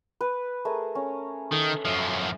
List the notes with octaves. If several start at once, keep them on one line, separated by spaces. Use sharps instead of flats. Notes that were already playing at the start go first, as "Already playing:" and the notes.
B4
A3 G#4 A#4
C#4
D#3 A4
F#2 F3 E5